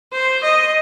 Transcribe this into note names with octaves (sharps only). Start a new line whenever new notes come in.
C5
D#5